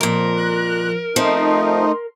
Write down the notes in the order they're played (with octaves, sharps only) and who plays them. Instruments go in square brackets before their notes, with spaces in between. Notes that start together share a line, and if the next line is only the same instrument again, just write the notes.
[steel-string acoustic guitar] F2 A#2 [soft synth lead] F3 [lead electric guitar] A#4
[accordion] F#6
[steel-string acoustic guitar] F3 C4 [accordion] A3 D#4 [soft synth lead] C6